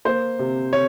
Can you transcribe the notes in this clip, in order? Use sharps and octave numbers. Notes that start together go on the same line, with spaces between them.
A#3 C5
C3
C#5